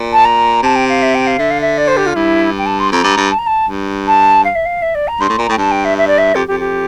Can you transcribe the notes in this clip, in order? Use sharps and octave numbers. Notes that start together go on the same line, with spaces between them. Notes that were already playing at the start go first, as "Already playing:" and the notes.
Already playing: A#2
A5
A#5
C3 A5
G5
F5
E5
G5
F5
D3 E5
F5
E5
D5
C5
G4
F4
G2 E4
G5
A5
C6
F2 A#5
G2
G2
A5
A#5
A5
G2
A5
F5
E5
F5
E5
D5
A#5
G2 C6
A2
A#2 A#5
A2 G5
G2 A5
G5
E5
E5
D5
E5
F2 G4
F2 G4
G4